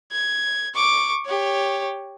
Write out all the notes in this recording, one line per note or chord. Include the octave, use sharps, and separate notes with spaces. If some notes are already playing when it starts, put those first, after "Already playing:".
G#6
C#6 D6
G4 C#5